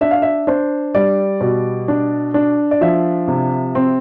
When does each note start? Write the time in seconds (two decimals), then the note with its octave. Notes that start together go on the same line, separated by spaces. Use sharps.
0.01 D4 E5
0.11 F5
0.22 E5
0.47 D4 C5
0.95 G3 D5
1.41 B2
1.88 D4
2.34 D4
2.71 D5
2.81 F3 E5
3.28 C3
3.75 C4